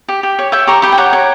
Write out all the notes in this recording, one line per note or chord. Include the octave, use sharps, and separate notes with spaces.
G4
G4
C#5
C#5 E5 G5
G4 A#5 C#6
G4 G5 B5
G5
C#5 F#5 A#5
C#5